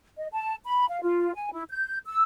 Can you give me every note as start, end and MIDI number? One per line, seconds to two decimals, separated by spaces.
0.17 0.27 75
0.33 0.54 81
0.64 0.86 83
0.89 1.00 77
1.02 1.34 65
1.35 1.50 80
1.52 1.63 64
1.69 1.98 91
2.06 2.23 88